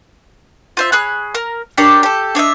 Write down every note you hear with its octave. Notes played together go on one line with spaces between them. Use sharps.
F4 C5 E5
G#4 C#5 B5 F#6
A#4
D4 G4 A#4 C#5
G4 A4
D4 C#5 D#5 E5